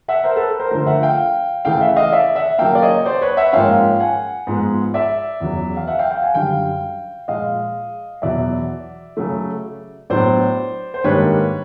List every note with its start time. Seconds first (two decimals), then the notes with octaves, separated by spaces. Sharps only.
0.08 E5 F#5
0.24 A#4 C5
0.36 A4 B4
0.60 A#4 C5
0.71 D3 F3 A3 A#4 C5
0.86 E5 F#5
1.03 F5 G5
1.65 C#3 E3 A3 F5 G5
1.81 E5 F#5
1.96 D#5 F5
2.12 D5 E5
2.35 E5 F#5
2.58 C#3 F#3 A#3 F5 G5
2.75 D5
2.82 C#5 D#5
3.05 C5 D5
3.22 B4 C#5
3.37 E5 F#5
3.53 G#2 F3 A#3 C#4 F5 G5
4.00 F#5 G#5
4.47 G#2 F3 G#3 B3
4.94 D5 E5
5.40 E2 C#3 F#3
5.77 F5
5.87 E5 F#5
5.99 F5 G5
6.11 F5 G5
6.23 F#5 G#5
6.34 F#2 D3 G3 F5 G5
7.28 A#2 F3 G#3 D#5 F5
8.22 E2 B2 F#3 D5 E5
9.17 C#3 F#3 A3
10.10 A2 F#3 B3 D4 C5 D5
10.94 C5
11.04 G#2 D#3 G3 A#3 D4 B4 C#5